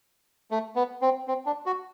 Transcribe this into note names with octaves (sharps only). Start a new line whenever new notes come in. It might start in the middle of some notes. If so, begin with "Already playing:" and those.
A3
B3
C4
C4
D4
F#4